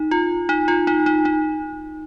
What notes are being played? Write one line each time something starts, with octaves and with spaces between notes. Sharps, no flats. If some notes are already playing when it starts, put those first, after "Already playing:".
Already playing: D#4
F4
D#4
F4
D#4
D#4
D#4